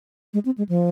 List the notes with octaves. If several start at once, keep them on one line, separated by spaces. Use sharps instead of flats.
G#3
C4
G#3
F3